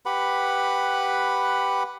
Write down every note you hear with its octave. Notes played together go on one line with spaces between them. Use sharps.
G4 B4 F#5 B5